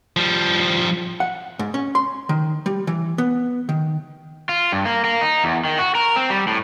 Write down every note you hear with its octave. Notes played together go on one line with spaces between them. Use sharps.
F3 G3
F#5
G#2
C#4
C6
D#3
G3
E3
B3
D#3
F4
G2
A#3
A#3
D#4
E2
D#3
F#4
A#4
C4
G3
A2